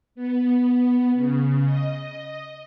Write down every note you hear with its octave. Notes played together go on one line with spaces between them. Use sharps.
B3
C#3
D#5